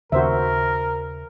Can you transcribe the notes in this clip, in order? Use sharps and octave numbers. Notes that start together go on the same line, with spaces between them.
D#2 C#3 F#4 A#4 C5 E5